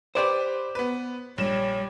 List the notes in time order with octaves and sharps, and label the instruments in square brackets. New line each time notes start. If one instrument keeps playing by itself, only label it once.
[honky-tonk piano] G4 B4 C6 [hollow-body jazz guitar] C5 D5
[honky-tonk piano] B3 B4
[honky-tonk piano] A#1 E7 [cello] G3 [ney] C#5